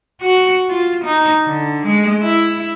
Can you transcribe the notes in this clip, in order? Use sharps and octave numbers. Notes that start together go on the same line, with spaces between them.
F#4
F4
D#4
D3
G#3
E4